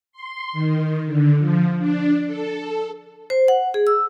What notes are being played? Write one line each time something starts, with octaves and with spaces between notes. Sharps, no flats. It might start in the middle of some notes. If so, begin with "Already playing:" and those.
C6
D#3
D3
F3
D4
A4
C5
F#5
G#4
E6